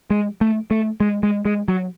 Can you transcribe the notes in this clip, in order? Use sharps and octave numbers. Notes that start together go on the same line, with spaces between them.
G#3
A3
A3
G#3
G#3
G#3
F#3